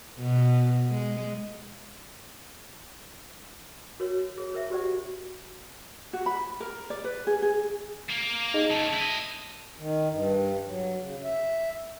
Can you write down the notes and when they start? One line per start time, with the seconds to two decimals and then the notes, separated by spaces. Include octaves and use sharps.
0.20 B2
0.90 G#3
4.00 F#4 A#4 B4 C#5
4.38 G#4 C#5
4.54 A#4 C5 E5
4.70 F#4 G4 C5 D5 F#5
6.13 F#4
6.26 B5
6.60 A#4
6.90 D5
7.04 B4
7.27 G#4
7.42 G#4
8.10 A#3
8.54 D#4 G#4 D#5
8.71 C#3 A3 A5
8.93 E4 D#5
9.78 D#3
10.10 G2
10.67 F#3
10.97 C#3
11.24 E5